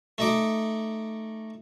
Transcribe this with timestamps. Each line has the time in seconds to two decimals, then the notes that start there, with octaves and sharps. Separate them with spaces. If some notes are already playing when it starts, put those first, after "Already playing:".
0.18 A3 D#4 D6